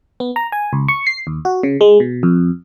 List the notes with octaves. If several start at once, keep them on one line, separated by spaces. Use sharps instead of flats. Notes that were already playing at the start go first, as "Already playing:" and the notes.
B3
A#5
G#5
C#2
C#6
C7
D#2
F#4
C#3
G#3
B2
F2